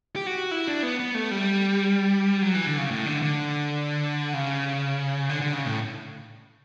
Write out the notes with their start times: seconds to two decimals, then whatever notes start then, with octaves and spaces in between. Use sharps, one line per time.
0.16 G4
0.27 F#4
0.51 E4
0.68 D4
0.83 B3
0.99 B3
1.15 A3
1.31 G3
2.42 F#3
2.55 E3
2.67 D3
2.78 C#3
2.91 A2
3.06 D3
3.22 D3
4.34 C#3
5.29 D3
5.41 D3
5.54 C#3
5.65 A2